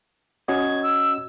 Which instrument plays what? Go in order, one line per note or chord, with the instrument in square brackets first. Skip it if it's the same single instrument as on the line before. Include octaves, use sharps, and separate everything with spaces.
[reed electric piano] C#4 F#4 D#5 [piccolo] G#6
[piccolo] E6